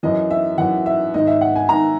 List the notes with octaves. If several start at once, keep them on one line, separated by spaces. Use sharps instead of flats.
F#2 E3 D#5
E5
F#2 E3 F#5
E5
G#2 D#3 D#5
E5
F#5
G#5
G#2 D#3 A#5